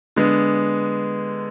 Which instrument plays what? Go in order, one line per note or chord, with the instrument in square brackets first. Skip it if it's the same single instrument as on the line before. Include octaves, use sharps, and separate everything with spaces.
[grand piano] D3 G#3 B3